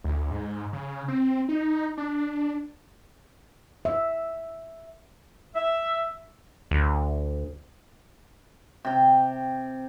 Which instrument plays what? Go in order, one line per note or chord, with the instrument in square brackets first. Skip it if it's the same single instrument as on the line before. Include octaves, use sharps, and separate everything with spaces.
[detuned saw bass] D2
G#2
C#3
C4
D#4
D4
[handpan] E5
[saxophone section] E5
[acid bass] D2
[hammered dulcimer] C3 G5